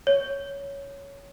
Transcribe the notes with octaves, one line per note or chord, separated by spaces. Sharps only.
C#5